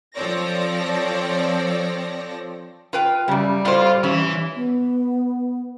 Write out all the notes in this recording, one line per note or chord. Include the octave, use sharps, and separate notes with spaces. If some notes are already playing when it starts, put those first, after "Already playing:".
F3 C4 A4 C#5 D5 A#6
F4 B4 G5
F#2 C#3 G3
A2 F4 C5
E3 C#4
B3